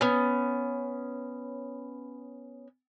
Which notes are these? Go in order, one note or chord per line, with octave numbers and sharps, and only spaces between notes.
B3 C#4